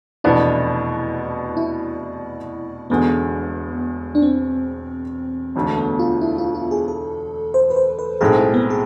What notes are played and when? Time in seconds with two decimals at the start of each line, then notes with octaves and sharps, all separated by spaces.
0.24 F1 E2 B2 B3 D4 E4
1.57 E4
2.90 E1 E2 D3 G#3 B3
4.15 D4
4.22 C4
5.56 E1 D2 D3 A3
5.78 B3
5.99 F4
6.21 E4
6.38 F4
6.55 F4
6.71 G#4
6.88 A4
7.54 C5
7.70 B4
7.76 C5
7.99 B4
8.21 B1 A2 G#3 C4 G#4
8.37 E4
8.54 B3
8.70 G#4